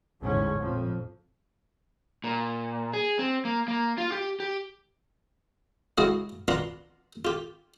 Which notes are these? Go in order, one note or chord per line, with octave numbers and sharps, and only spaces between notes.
A1 E2 G#2 D3 C#4
F2 A#2 F3
A#2
G#4
C4
A#3
A#3
F4
G4
G4
C#3 G#3 E4 F#4 D#5 F5
D4 F4 B4 F#5 A#5 C6
F4 G4